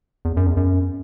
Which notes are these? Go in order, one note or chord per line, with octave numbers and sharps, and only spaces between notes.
E2
F#2
E2
F#2